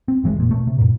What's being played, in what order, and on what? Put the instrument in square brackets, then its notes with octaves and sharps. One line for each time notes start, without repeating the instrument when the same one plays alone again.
[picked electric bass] C4
G1 E3 G#3
F1 A#2
B2 A3
C3
F#2 A#2